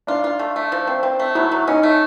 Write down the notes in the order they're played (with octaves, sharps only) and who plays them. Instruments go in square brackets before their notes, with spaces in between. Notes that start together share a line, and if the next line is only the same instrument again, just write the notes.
[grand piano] D4 [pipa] F4
[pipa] F4
A3
A3
F3
C4
C4
A3
[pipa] F#3 [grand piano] E4
[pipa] F#3
[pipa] C#4 [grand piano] D#4
[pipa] A3